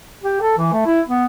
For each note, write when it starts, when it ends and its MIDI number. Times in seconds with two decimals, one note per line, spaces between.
0.23 0.37 67
0.41 0.53 69
0.58 0.69 52
0.73 0.82 57
0.86 1.00 64
1.08 1.25 59